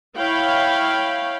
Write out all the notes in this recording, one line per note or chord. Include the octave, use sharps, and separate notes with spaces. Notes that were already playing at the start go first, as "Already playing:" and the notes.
E4 C#5 F5 G5 B5